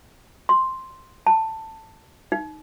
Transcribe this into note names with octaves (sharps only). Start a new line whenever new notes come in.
C6
A5
D#4